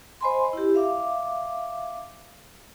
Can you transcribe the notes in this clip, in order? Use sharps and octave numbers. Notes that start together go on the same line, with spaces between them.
C5 D#5 G#5 B5 C6
E4 G4
E5 F5 D6